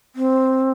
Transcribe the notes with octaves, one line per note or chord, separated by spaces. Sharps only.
C4